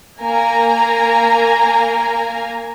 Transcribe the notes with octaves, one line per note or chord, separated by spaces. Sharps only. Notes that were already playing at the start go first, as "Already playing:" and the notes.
A#3 G#5 A#5